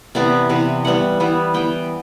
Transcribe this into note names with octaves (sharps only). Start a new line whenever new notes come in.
C3 E3 B3 D5
C3 E3 B3
E3 G3 B3 F#5
E3 G3 B3
E3 B3 G5